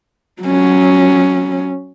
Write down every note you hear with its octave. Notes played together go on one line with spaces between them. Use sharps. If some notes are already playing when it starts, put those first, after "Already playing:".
F#3 C#4